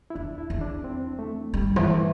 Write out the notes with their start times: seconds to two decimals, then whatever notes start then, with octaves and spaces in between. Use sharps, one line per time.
0.10 E4
0.15 E2 D4
0.38 E4
0.50 E2
0.61 D4
0.84 C4
1.19 A3
1.54 G2 G3
1.76 E3
1.88 A3